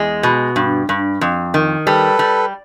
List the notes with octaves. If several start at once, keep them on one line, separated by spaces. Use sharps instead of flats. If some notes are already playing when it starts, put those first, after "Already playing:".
Already playing: E2 G#3
B2
G2
G2
F2
D#3
G3 A4 B4
G3